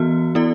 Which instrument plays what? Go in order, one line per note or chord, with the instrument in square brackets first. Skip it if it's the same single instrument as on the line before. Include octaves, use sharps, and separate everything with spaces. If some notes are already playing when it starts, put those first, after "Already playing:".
Already playing: [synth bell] E3 B3 F#4
B3 E4 A4 D5